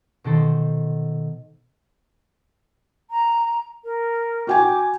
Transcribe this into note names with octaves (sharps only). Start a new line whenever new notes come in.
B2 D#3 A4 C5
A#5
A#4
F#4 G5 G#5 D6